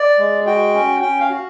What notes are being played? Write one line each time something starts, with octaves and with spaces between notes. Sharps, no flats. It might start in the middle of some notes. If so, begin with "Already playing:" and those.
Already playing: D5
G#3
F#4 G5
C#4
C#4 G5
F5
F#4